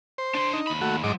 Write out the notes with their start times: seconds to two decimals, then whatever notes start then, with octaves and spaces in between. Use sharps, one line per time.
0.18 C5
0.35 D4 C6
0.53 D#4
0.67 D#2 B5
0.81 A3 F#4
1.04 G#2 F#3 F4 D#5 D6